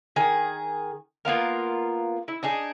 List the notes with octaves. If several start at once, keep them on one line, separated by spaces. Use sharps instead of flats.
D#3 G#4
A#3 B3 F4 A#4
E4
D4 D#4 G#4